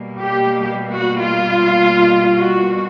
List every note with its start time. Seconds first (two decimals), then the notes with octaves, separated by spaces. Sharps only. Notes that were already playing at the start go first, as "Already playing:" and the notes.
Already playing: B2 G3 A#3
0.22 G4
0.93 F#4
1.21 F4
2.36 F#4